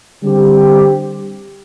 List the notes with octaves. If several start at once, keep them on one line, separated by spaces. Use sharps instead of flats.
D3 G3 C4 G4